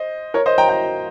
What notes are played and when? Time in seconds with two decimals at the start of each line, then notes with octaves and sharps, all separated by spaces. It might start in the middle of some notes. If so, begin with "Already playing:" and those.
Already playing: C5 D#5
0.34 A#4 C#5
0.46 C5 D#5
0.58 G5 A#5
0.69 G5 A#5